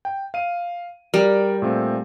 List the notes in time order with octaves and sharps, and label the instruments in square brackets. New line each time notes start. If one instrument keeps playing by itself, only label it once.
[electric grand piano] G5
F5 D#7
[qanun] G3 [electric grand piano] A#4 D5 G5
[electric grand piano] A#2 A3 C4